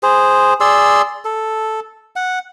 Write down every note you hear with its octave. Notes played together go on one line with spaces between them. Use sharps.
G#4 C5
G#4 D5 C6 E6
A4
F#5